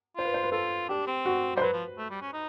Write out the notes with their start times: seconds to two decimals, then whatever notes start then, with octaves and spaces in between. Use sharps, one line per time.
0.17 F4 C5
0.25 B4
0.34 C5
0.43 B4
0.52 F4 A4
0.89 D4 G4
1.07 C4
1.26 F#4
1.56 G3 C5
1.61 F#3 B4
1.73 F3
1.98 A3
2.10 G3
2.21 C#4
2.34 D#4